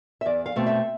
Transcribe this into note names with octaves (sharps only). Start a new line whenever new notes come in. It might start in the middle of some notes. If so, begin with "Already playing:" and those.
E5
E2 D5
F5
B2 A3 C4
E5